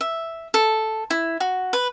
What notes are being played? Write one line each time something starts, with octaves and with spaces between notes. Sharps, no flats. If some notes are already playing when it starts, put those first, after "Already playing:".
E5
A4
E4
F#4
B4